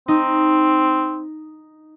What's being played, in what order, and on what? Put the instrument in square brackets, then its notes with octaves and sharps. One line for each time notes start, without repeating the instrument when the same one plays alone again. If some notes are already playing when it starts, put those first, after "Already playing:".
[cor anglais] C4 [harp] D#4